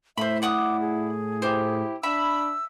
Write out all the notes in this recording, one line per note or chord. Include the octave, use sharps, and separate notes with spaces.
A2 C5 E5 B5
E4 D5 F#5 D6 D#6
G#4
E4 G4 C5
D4 E5 B5 E6